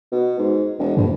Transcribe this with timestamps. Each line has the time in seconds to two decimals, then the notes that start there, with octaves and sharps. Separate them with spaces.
0.12 B2
0.39 G#2
0.79 E1
0.97 A#1 G2